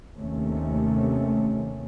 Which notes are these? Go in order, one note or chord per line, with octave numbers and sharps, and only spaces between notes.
D#2 C3 D#3 A3 C#4